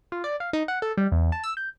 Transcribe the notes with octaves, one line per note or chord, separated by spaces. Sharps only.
F4
D5
F5
D#4
F#5
A4
G3
E2
A5
E6
G6